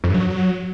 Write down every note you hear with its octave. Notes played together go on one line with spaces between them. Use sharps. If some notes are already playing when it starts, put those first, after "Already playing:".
F2
G2
F#3